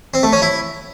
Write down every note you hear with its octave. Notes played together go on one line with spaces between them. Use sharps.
C4
A3
C#4
E4